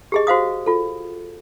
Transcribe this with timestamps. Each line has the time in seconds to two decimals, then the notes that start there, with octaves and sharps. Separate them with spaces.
0.12 G4 G#4 D#5
0.27 F#4 C5 F5 D#6
0.66 F4 A4